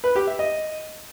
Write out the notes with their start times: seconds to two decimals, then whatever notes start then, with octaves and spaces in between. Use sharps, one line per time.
0.04 B4
0.15 G4
0.27 E5
0.39 D#5